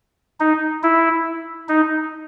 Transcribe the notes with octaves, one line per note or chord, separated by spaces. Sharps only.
D#4
E4
D#4